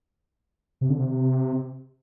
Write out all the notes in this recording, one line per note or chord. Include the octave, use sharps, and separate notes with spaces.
C3
D3
C3